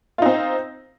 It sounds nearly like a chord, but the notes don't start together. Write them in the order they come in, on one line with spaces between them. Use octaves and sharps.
F4 D#4 C4